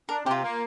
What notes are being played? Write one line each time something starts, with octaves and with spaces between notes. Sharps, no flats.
D4 A#4
C3 G4
F4
A#3